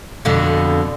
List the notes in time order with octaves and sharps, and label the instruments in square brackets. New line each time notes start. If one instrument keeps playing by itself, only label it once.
[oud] F2 B2 D3